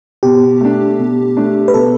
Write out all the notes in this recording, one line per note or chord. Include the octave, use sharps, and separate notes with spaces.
B2 G4
A3 D4
B2
A3 D4
B4
B2 A4